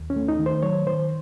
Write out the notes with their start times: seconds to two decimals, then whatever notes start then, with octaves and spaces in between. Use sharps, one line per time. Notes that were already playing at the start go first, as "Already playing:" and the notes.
Already playing: D#2
0.10 C#4
0.16 A3
0.28 D#4
0.39 D#3
0.46 C5
0.63 F#3 C#5
0.87 D#3 C5